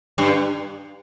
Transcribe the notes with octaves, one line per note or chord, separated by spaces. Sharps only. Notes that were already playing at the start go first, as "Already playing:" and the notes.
G2